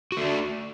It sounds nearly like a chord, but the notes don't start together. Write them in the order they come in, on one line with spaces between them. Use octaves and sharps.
F#4 A3 D4